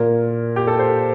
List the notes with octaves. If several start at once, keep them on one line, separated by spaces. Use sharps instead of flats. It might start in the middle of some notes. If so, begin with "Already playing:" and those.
Already playing: A#2 A#4
G4
A4
C5